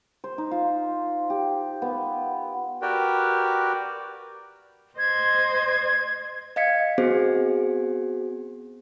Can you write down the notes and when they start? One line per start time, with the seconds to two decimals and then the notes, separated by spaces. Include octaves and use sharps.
0.24 C5
0.38 D#4
0.51 F4
1.30 G4
1.82 B3
2.82 F#4 G4 A#4 B4 D5 G5
4.98 C5 D#5 G#6
6.56 D#5 F5 G#6 B6 C#7
6.98 B3 C4 F#4 G#4 C5